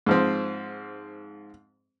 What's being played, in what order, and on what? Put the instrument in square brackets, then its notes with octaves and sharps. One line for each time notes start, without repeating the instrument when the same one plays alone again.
[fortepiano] G#2 F3 C4